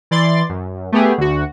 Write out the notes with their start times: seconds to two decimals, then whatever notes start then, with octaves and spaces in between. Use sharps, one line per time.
0.11 E3 D5 C6 A6
0.49 F#2
0.92 A3 B3 G4 G#4
1.18 D2 F#4